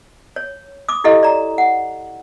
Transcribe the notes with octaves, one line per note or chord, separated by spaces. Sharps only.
C#5
D6 D#6
E4 G4 A4 D#5 F5
D5 A#5
F#5